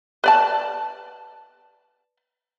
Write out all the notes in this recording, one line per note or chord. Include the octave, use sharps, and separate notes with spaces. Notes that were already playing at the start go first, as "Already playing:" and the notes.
B4 D5 A5